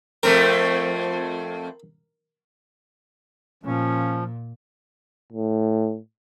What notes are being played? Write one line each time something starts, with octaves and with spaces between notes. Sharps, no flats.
F2 A3 C4 A#4
A#2 F3 C#4
A2